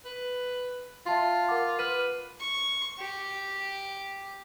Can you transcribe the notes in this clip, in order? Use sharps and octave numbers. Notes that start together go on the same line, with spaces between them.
B4
F4 E5 A5 C6
A#4 F#5 D6
B4 F6 D#7
C#6
G4